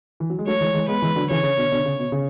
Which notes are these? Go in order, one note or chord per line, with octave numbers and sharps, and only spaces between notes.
E3
F#3
G#3
F#3 A3 C#5
E3 G#3
E3 G#3
G#3 B3 B4
E3 G#3
D3 F#3
C#3 E3 C#5
C#3
B2 D3
B2 D3
C#3
B2
C#3